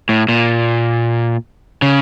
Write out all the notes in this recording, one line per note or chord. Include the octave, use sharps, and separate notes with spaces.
A2
A#2
C#3